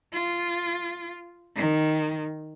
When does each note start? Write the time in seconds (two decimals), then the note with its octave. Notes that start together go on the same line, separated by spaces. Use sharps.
0.13 F4
1.55 D#3